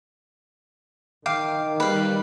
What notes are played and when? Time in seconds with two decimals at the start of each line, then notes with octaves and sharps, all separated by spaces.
1.26 D#3 F5 G5 D6
1.80 G3 B4 F5